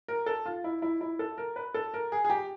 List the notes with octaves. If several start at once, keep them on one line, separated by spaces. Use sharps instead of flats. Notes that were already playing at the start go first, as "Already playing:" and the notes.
A#4
A4
F4
E4
E4
E4
A4
A#4
B4
A4
A#4
G#4
G#4
G4